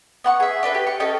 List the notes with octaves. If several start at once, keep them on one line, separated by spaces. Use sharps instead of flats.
B3 F#5 C#6
G#4 E5
D4 A4 B4
G4
C#6
C#4 A4 D#5 G5